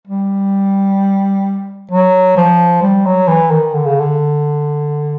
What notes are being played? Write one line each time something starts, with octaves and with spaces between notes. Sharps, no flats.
G3
F#3
F3
G3
F#3
E3
D#3
D3
C#3
D3